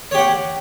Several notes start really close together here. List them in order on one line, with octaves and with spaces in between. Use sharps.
C#5 G4 F#5